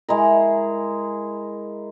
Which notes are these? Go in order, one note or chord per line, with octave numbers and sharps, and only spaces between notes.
G#3 E4 A#4